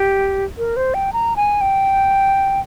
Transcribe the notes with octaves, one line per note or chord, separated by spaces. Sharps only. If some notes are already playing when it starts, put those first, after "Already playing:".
Already playing: G4
A#4
C5
G5
A#5
G#5
G5